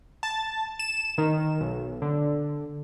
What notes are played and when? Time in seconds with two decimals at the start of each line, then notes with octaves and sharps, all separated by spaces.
0.23 A5
0.79 E7
1.18 D#3
1.61 B1
2.02 D3